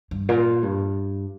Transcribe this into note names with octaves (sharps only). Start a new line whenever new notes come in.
G2
A#2
G2